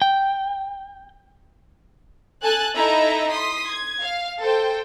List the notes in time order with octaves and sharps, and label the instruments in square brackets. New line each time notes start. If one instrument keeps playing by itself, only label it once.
[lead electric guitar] G5
[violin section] A4 G#5 A5 F#6 A6
D#4 E4 A4 D#5 E5 A#5
C6 D#6 B6
G#6
F5
A4 C5 G5